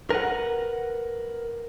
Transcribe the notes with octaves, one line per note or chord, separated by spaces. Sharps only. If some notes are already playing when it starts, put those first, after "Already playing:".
A#4 B4 F#5